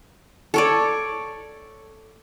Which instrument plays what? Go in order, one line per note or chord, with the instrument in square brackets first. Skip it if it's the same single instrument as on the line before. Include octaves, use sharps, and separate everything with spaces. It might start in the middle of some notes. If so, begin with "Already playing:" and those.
[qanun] A4 C#5 D5